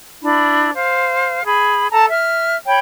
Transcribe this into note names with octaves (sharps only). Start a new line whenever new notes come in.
D4 E4 B5
C5 F5
G#4 B5
A4 A5 A#5
E5 F6
C#5 G5 B5